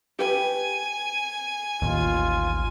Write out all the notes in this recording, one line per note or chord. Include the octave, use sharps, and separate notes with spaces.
G4 B4 G#5
A1 D#2 F4